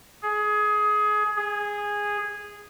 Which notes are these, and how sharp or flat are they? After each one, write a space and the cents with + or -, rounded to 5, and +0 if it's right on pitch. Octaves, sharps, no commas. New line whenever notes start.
G#4 +20
G#4 -10